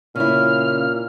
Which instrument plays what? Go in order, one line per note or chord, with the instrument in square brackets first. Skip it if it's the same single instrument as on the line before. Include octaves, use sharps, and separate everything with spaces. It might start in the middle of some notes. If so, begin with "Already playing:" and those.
[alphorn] A#2 [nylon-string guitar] C#3 E4 [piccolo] F6